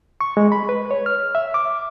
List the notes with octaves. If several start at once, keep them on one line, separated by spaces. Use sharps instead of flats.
C#6
G#3
B5
B4
C#5
F6
E5
D6